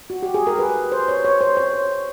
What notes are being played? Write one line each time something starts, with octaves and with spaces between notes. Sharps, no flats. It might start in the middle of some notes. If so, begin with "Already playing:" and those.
F#4
G4
G#4
A#4
B4
C5
C#5
C#5
C5
C#5